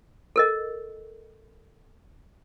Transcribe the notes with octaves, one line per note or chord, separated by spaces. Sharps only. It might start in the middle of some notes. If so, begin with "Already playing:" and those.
A4 A#4 D#5